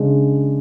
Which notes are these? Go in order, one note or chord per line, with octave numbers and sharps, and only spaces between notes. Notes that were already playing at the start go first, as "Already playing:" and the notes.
Already playing: C#3 G#3 D4 G#4